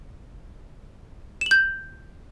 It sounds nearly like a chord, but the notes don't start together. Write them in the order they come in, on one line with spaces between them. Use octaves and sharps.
E7 F#7 G6